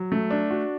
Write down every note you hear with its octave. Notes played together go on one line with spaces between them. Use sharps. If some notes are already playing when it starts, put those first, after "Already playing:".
Already playing: F#3
A3
D4
F#4